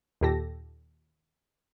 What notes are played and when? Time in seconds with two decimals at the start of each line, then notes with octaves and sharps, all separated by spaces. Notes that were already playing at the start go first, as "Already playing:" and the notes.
0.21 D#2 A#2 G4 A4 A#6